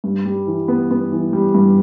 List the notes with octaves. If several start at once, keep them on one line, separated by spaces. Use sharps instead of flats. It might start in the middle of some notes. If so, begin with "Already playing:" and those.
G2
G3
E3
B3
B3
E3
G3
G2